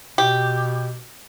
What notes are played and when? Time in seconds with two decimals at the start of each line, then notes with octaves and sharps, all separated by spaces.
0.18 B2 G4